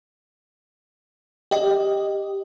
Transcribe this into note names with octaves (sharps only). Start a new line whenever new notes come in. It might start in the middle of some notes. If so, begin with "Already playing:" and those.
G4 D#5